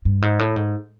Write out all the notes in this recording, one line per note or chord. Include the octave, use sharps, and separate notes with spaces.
G2
G#2
A2
G#2